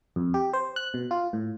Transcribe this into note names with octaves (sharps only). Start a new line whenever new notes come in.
F2
G4
C5
F#6
B2
F4
A2